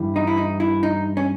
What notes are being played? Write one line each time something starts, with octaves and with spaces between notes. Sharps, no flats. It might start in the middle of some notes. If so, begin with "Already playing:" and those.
Already playing: G2 E3
D#4
E4
D#4
E4
D#4
C#4